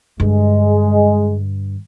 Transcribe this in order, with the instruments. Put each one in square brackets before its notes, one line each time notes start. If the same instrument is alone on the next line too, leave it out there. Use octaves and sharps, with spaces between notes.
[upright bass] G2 D3 [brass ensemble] G#3